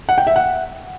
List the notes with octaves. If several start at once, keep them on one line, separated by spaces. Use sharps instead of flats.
F#5
G5
E5
F#5